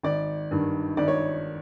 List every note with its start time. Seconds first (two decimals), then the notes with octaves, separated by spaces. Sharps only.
0.03 G#1 D5
0.51 G2 D#3
0.97 G#1 D5
1.08 C#5